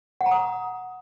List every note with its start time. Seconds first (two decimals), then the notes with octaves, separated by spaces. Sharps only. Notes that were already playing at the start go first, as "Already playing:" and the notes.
0.21 F#5
0.26 A#5
0.31 D#6